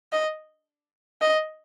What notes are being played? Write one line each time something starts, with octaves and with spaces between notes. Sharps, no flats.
D#5
D#5